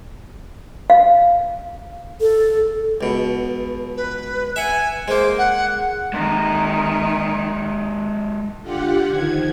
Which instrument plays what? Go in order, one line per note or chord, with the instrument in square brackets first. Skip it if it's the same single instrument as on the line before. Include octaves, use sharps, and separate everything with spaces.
[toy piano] F5
[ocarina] A4
[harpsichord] C#2 B2
[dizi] B4
[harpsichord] E5 F#5 [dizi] G#5
[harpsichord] G#3 A#3 [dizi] C5
[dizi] F#5
[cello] D#3 [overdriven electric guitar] G#3 A#3
[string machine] D3 F4 G4 F#5
D#3 F3 G#6